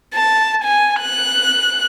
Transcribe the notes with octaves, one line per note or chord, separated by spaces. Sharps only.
A5
G#5
F#6